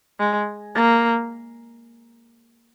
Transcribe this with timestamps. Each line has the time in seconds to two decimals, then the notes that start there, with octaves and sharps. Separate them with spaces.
0.19 G#3
0.75 A#3